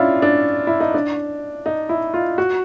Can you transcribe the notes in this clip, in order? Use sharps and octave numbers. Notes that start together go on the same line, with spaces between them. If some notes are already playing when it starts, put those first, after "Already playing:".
Already playing: C#4 D4 E4 F4
D4
E4
D#4
D4
D#4
E4
F4
F#4